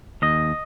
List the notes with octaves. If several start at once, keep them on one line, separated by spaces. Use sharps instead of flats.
D#2 D#5